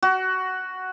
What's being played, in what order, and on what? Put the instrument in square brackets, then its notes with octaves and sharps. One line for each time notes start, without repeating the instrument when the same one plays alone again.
[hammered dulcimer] F#4